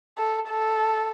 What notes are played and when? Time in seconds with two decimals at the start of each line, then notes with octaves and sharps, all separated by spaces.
0.18 A4
0.49 A4